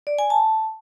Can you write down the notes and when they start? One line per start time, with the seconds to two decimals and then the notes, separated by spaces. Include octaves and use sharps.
0.07 D5
0.19 G#5
0.30 A5